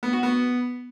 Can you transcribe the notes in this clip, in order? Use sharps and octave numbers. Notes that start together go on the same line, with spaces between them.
B3
F#4
B3